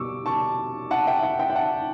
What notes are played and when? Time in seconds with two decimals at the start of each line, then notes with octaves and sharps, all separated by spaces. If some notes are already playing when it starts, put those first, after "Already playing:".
Already playing: B2 G3 C#6 D6 E6
0.26 A5 C#6
0.91 F#5 A5
1.07 E5 G5
1.23 F#5
1.39 E5 G5
1.50 G5
1.55 F#5 A5